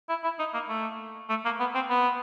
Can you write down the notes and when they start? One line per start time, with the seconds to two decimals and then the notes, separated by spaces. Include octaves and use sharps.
0.09 E4
0.23 E4
0.39 D#4
0.54 A#3
0.69 A3
1.30 A3
1.45 A#3
1.60 B3
1.75 C4
1.90 B3